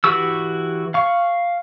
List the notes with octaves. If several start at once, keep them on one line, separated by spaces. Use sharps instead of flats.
E3 F#4 G4 C#6 E6
F5 C#6